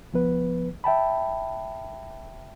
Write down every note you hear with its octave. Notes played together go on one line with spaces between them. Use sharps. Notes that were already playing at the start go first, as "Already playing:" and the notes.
C#2 F3 B3 B4
E5 G5 A5 B5